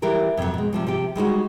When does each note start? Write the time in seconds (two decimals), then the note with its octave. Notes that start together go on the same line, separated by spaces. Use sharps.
0.02 E3 G3 G4 A#4
0.37 F2 C3 D#3 F#3
0.54 B2 G#3
0.73 C3 F3 G3
0.87 C3 F3 G4
1.16 G3 G#3 D#4 F#4